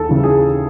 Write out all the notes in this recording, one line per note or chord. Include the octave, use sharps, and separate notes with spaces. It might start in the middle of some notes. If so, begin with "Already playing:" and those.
Already playing: D#2 A4
C#3 E3
G#4